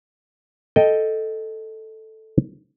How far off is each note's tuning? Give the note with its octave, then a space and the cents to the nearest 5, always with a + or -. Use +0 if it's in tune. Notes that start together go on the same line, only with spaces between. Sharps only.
A4 +0 D#5 +0 G5 +0